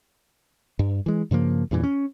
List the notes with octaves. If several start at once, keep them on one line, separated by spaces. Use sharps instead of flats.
G2
E3 G#3
G2 C#3 F3 A#3
E2 G2 A#2 E3
C#4